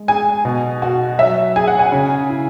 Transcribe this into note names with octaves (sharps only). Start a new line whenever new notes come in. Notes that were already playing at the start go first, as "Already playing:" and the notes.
Already playing: G#3
G#4 G#5
B2
F#4
F#3 E5
G#4 G#5
F#5
G#5
C#3
E4